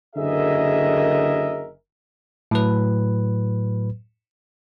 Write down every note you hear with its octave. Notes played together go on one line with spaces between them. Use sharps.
F#1 D3 G#4 A#4 D#5 E5
A2 F#3 B4